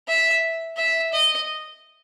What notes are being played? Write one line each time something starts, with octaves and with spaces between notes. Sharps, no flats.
E5
E5
D#5